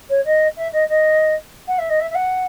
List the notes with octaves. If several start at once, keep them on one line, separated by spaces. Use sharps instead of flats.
C#5
D#5
E5
D#5
D#5
F#5
E5
D#5
E5
E5
F#5